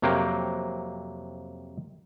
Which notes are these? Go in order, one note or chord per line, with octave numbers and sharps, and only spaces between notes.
F2 C3 F#3 A#3 G5